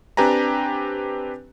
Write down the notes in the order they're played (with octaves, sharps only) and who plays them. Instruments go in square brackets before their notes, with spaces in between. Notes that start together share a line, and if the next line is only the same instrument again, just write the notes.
[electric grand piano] C4 D4 G4 B4 G#5 A#5